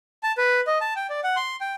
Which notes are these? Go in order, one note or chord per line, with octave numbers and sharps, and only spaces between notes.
A5
B4
D#5
A5
G5
D5
F#5
C6
G5